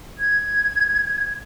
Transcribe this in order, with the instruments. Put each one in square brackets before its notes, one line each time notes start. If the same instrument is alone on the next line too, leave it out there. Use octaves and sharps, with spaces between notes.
[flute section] G#6